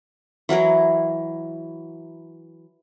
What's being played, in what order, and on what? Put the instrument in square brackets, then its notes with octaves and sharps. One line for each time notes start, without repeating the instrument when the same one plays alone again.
[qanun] E3 F#3 E4 A#4